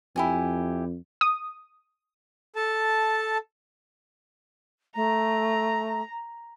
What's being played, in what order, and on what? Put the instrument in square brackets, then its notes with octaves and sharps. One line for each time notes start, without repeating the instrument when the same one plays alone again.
[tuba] F2 [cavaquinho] E4 G4 G#5
[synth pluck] D#6
[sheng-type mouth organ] A4 A5
[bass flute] A3 [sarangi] A#5